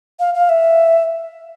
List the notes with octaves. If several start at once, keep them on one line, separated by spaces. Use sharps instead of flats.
F5
F5
E5